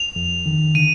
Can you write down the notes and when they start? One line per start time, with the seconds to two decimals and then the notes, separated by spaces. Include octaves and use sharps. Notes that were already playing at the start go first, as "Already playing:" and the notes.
Already playing: F7
0.16 F2
0.46 D#3
0.75 D3 D#7